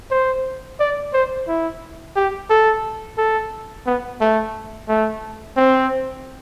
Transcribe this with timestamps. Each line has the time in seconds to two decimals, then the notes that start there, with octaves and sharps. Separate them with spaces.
0.11 C5
0.80 D5
1.13 C5
1.48 E4
2.16 G4
2.50 A4
3.18 A4
3.86 B3
4.21 A3
4.89 A3
5.57 C4